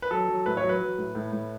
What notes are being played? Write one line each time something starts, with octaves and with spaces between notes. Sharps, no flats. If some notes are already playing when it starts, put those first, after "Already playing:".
B4
F#3 A4
F#3
A2 B4
C#5
F#3
B4
F#3
A2
A2
A2